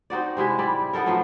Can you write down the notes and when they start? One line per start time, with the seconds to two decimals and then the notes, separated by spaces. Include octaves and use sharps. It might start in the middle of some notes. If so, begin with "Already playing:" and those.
0.10 C4 D#4 F#4 D5
0.37 C3 G#3 E4 E5
0.59 G3 E4 D5
0.93 B3 D#4 A4 A#4
1.06 F3 F#3 A3